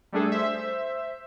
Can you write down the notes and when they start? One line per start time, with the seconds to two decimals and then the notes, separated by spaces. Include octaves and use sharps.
0.12 G3 A3 D4 G#4 A4
0.32 C5 E5